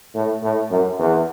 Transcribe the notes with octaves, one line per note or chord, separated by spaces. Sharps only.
A2
A2
F#2
E2